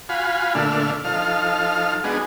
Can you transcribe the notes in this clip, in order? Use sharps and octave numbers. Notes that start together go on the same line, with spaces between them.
F4 F#4 F5 G#5 B5
A#2 D3 A3 D4 E5 F6
F3 D#4 A4 F5 F6
G#3 B3 D4 D#4 F#4 G#4